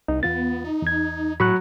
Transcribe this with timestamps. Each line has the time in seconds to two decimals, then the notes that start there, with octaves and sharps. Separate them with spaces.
0.08 C2 D#4
0.23 E2 B3 F4 A6
0.64 D#4
0.82 E2 G#6
1.40 A2 F#3 B5 C#6 F#6